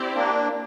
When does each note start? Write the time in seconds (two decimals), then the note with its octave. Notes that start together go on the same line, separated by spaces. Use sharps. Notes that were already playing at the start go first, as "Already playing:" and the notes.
Already playing: C4 E4 G4 D5
0.15 A#3 D4